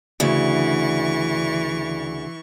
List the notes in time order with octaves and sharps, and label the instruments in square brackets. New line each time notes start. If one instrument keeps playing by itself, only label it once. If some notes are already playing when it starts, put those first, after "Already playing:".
[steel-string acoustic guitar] D2 C#3 [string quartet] E3 C#6